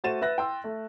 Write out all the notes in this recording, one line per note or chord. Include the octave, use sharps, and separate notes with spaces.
A3 F#4 C5 A6 D#7 E7
B4 E5 F#6 A#6
G5 C6 E6
A3